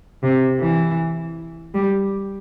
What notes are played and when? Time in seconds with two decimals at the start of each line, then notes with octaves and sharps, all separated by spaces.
0.23 C3
0.60 E3
1.74 G3